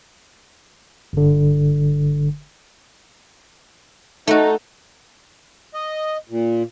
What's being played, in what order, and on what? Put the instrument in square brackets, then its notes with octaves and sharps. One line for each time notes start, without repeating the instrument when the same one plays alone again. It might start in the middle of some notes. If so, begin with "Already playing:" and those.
[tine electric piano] G1 D3
[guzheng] A3 F#4 [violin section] D#4 A4
[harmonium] D#5
A#2